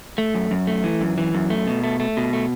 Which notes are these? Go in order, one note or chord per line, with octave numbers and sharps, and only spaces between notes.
A3
F#2
F#2
A3
E3
F#2
E3
F#2
A3
B2
A3
A3
B2
A3